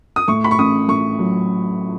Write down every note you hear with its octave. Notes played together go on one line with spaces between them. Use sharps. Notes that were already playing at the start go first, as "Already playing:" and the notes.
D#6
A2 C#6
B5
C#6
A1 D#6
A2 C#6
F#3